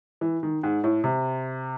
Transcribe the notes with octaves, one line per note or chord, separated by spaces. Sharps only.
E3
D#3
G#2
A2
C3